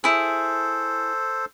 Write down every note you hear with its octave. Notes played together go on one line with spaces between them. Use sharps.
E4 G#4 A4 C5